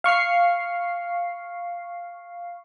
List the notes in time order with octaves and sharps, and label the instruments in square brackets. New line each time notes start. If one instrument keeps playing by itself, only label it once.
[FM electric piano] F5 C#6 F6 C7